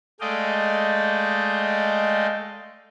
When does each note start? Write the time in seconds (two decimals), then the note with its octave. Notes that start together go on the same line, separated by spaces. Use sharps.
0.21 G#3 A3 D5 D#5 F5 G5